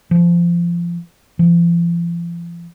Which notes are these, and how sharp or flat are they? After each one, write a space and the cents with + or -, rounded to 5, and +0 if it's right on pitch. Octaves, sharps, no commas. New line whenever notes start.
F3 -20
F3 -40